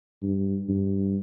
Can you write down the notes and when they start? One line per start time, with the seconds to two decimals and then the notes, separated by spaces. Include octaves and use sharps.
0.23 G2
0.69 G2